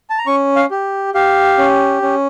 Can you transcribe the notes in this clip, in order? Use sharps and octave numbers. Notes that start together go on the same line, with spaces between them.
A5
A#5
C#4 C#6
F5
G4
G4 F5
C#4
C#4